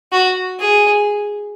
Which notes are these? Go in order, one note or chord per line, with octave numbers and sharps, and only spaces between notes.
F#4
G#4